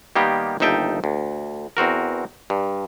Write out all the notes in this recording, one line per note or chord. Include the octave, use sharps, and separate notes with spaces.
D#3 G3 A#3 B3 G4
G1 D#2 D#4 E5 G5 A5
D2
E2 C4 F#4 A#4
G2